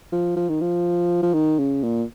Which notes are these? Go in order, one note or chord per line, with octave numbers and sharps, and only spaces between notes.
F3
F3
D#3
F3
F3
D#3
C#3
A#2